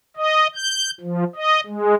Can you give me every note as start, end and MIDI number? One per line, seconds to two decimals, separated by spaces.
0.17 0.47 75
0.55 0.91 91
1.01 1.24 53
1.36 1.61 75
1.66 1.95 56